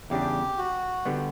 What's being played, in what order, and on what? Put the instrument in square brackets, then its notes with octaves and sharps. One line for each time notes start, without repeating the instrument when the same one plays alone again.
[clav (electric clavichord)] E2 C#3 G3 D4 [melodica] G4
[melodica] F#4
[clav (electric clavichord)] D3 G3 B3